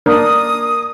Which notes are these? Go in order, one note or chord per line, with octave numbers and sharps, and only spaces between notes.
A#3 D4 D#6